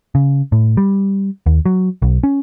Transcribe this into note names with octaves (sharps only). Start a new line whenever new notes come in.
C#3
A2
G3
D#2
F#3
B1
C#4